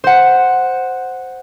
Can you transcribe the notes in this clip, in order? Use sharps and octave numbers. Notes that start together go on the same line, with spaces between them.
C5 F#5